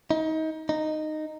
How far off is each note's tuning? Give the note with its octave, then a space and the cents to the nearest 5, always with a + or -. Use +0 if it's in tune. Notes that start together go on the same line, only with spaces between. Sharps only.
D#4 +30
D#4 -10